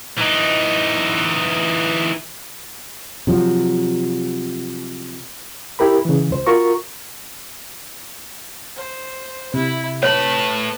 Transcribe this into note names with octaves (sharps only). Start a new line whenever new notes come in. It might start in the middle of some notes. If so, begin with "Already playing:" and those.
E3 D#4
C3 F3 F#3
E4 G4 A#4 B5
C#3 E3
C#2 C5
F4 F#4 A#4 A#5 C#6
C5
C3 E4
A2 B4 C#5 A5 B5